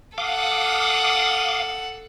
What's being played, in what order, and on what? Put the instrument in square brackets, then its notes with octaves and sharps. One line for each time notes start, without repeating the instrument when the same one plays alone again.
[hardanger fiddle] A4 F#5 [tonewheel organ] F5 D6 D#6